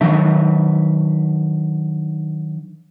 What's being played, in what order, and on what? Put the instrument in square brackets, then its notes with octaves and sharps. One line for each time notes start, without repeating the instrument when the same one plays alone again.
[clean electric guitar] D#3 F#3 D4 E5